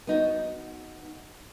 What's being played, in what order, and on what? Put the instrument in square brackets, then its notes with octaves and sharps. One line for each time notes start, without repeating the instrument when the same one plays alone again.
[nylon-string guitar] B3 D#4 F#4